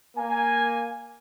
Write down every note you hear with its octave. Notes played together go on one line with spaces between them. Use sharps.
A#3 G#5